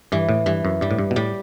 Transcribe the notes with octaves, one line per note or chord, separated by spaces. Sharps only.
G2 E3
A2
G2 E3
F#2
G2 G3
A2
G2
B2
A2 G3